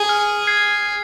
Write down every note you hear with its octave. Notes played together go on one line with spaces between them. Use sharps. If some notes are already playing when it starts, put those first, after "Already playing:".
Already playing: G#4
F6
G#6 C7